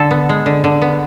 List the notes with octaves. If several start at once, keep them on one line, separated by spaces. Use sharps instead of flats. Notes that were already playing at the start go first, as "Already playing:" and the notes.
Already playing: D3 A4
B3
G#3
D3
D3
B3